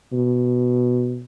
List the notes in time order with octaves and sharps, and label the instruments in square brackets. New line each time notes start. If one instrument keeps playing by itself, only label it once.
[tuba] B2